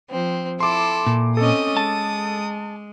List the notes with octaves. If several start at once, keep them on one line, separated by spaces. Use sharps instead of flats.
F3 C4
E4 A4 C6 D6
A#2
C4 C#4 A4 D#5 D#6
G#3 A5